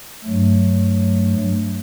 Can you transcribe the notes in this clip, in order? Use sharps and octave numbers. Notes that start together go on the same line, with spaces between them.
G2 F#3 A3